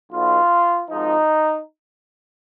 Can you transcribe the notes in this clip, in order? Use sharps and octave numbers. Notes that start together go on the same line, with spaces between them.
B1 B2 F4
G#1 G#2 F3 D#4